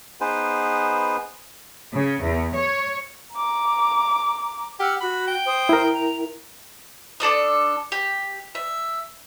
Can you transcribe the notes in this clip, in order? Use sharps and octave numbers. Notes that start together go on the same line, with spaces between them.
B3 D#4 G#4 B4 C5
C#3
E2
C#5
A#5 D6
G4 F#5 E6 F6
F#4 B5
G5
C5 D#6
E4 A#4
G5 A#5
D4 A4 D5 D#6
G4
E5